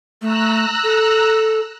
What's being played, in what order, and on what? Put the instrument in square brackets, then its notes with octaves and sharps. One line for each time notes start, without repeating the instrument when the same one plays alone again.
[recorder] A3 [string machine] A#5 E6 F#6
[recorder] A4